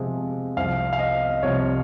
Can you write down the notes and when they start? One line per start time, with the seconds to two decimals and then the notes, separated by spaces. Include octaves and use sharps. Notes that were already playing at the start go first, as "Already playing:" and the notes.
Already playing: C3 F3 G#3
0.57 C2 C3 F3 F5
0.93 F5
0.99 D#5
1.42 C2 C3 F3 C#5